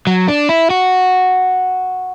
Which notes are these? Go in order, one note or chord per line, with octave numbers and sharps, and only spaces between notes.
F#3
D4
E4
F#4